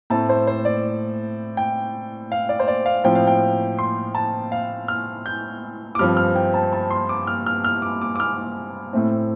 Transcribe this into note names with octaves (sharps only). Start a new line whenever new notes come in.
A2 A3 C4 A5
C5
C5
D5
G5
F5
D5
C5
D5
F5
A2 F3 C4 G5
F5
G5
C6
A5
F5
F6
G6
D6
G2 F3 C4 F6
F6
G5
A5
A5
C6
D6
F6
F6
F6
D6
D6
D6
F6
A2 A3 C4